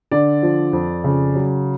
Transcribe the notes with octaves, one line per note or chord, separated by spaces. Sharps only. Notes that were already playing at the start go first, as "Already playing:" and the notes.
D3 D5
F3
F2
C#3
F#3